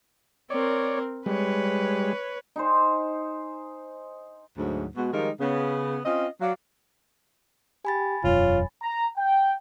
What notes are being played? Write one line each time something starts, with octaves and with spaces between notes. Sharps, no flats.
C4 A#4 C#5 D5
G3 G#3 B4 C#5
D#4 G#4 C5
D2 G#2 F#3
B2 G#3 F#4
D#3 F3 G3 G#3 D#4 A#4
C#3 B3
C4 C#4 F4 D#5
F#3 D5 F5
G4 G#5 B5 A6
E1 F#2 F4 C#5
A#5
G5